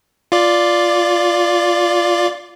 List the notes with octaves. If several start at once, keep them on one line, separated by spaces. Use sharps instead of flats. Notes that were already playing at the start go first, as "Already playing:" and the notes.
F4 D5